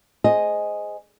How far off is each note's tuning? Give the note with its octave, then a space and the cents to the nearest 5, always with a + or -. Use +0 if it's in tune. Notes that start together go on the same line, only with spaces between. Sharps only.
G#4 +0 C5 +0 D#5 +0